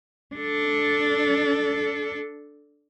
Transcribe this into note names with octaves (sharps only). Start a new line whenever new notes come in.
D4 A4